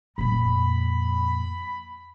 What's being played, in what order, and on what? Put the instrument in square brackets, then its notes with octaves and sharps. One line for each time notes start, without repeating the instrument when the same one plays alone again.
[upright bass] F2 A#2 [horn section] B5